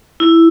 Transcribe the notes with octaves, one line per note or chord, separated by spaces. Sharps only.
E4